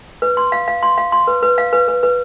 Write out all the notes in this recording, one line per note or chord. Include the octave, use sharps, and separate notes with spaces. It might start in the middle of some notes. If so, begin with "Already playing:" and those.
B4
C6
F5
F5
C6
F5
C6
B4
B4
F5
B4
B4
B4